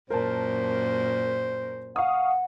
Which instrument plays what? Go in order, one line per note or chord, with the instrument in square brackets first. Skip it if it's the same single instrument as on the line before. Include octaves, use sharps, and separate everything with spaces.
[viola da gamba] F#2 A#2 A#3 [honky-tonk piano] A#4 A5 [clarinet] C5
[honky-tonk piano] F5 C#6 D#6 [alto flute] F#5